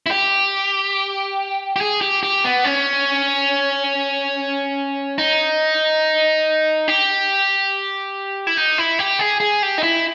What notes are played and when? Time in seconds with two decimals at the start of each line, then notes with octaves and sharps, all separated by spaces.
0.06 E4
0.11 G4
1.76 G4
1.81 G#4
2.01 G4
2.23 G4
2.44 B3
2.64 C#4
5.18 D#4
6.88 G4
8.47 E4
8.57 D#4
8.78 E4
8.99 G4
9.19 G#4
9.40 G#4
9.63 G4
9.78 D#4
9.83 E4